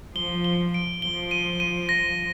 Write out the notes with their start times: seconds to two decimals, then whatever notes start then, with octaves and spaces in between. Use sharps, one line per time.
0.16 F3 G7
0.44 G7
0.74 D7
1.02 F3 G7
1.31 D#7
1.60 D#7
1.89 A#6